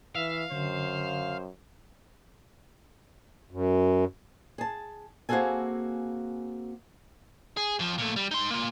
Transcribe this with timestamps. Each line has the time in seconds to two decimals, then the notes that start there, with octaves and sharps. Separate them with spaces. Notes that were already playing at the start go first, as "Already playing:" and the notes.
0.15 E3 E5 F5
0.52 F#2 D3 C5
3.51 F#2
4.58 G#4 A5
5.29 A#3 C4 F#4 G#4 A4 G#5
7.57 G#4
7.79 F2 F3
7.98 A#2 A3
8.16 G3
8.31 D#4 C6
8.50 A#3 F4